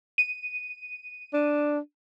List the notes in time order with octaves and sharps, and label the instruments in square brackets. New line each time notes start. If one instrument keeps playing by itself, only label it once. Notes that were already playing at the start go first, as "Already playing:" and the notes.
[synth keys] D#7
[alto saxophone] D4